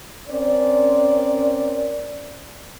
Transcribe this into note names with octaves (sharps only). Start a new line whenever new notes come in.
C4 C#4 A#4 D5